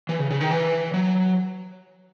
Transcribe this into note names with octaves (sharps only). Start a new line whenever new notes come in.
E3
C#3
C#3
D#3
E3
F#3